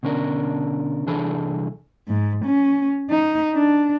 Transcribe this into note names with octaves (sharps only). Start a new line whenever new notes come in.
B2 D3 C#4 D4 A#4
C2 E3 D4 G#4 A4 B5
G#2
C#4
D#4
D4